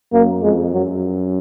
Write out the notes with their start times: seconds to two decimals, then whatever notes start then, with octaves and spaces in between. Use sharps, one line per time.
0.12 F#2 A#3
0.43 F2 G#3
0.73 F#2 F#3